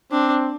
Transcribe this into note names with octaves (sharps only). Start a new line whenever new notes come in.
C4 D4